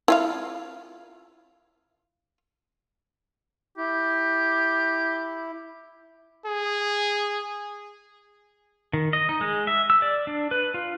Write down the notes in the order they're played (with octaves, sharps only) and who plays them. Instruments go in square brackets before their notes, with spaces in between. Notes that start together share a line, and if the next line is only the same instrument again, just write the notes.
[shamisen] E4 F4 F5
[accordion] E4 [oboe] G4
[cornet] G#4
[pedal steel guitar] D#3
D#5
D#4
G#3
E5
E6
D5
D4
B4
F4